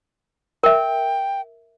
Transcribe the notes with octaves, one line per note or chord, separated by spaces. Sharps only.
A#4 E5 G5